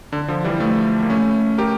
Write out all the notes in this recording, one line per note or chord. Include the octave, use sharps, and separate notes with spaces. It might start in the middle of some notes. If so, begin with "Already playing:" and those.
D3
D3 F3
E3 G3
F3 A3
A#3
A3 C#4
G4 A#4